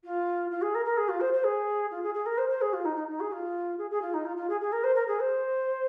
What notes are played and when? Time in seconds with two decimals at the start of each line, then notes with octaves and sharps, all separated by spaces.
0.04 F4
0.50 F4
0.61 G#4
0.74 A#4
0.85 A#4
0.97 G#4
1.08 F4
1.20 C5
1.33 C5
1.43 G#4
1.91 F4
2.03 G#4
2.14 G#4
2.25 A#4
2.37 C5
2.49 C5
2.61 G#4
2.73 F4
2.85 D#4
2.96 D#4
3.08 D#4
3.20 G#4
3.32 F4
3.78 G#4
3.90 G#4
4.01 F4
4.13 D#4
4.25 F4
4.36 F4
4.49 G#4
4.60 G#4
4.72 A#4
4.83 C5
4.95 A#4
5.07 G#4
5.19 C5